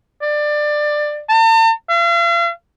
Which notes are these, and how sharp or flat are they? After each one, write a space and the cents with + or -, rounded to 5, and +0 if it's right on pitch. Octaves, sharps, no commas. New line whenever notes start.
D5 +20
A5 +45
F5 -40